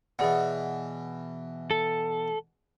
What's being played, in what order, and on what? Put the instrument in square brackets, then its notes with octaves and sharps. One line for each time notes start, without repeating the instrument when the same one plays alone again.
[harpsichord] B2 E3 [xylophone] G#4 D5 F#5
[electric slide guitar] A4